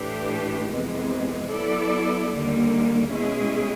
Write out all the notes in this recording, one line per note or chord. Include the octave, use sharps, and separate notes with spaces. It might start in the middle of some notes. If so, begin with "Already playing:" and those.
Already playing: A2 E3 A3 D4 G4
F2 C3 E3 G#3 B3
F#3 B3 E4 A4 D5
D#2 D3 G3 A#3
B2 G#3 C#4 E4 G#4